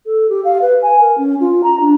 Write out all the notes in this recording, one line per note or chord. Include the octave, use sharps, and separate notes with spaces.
A4
G4
F5
B4
G#5
A#4
C#4
F4
A#5
D4